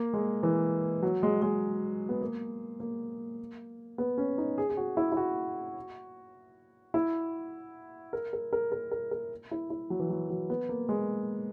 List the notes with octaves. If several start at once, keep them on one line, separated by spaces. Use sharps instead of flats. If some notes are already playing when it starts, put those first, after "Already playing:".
Already playing: A#3
G#3
E3
F#3
G#3
G#3
B3
A#3
A#3
B3
C#4
D#4
G#4
G#4
F#4
E4
E4
F#4
E4
A#4
A#4
A#4
A#4
A#4
A#4
E4
E4
F#3
E3
F#3
F#3
B3
A#3
G#3